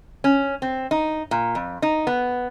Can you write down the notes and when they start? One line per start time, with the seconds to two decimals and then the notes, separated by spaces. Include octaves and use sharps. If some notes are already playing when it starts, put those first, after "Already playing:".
0.24 C#4
0.62 C4
0.91 D#4
1.31 A#2
1.55 F2
1.82 D#4
2.07 B3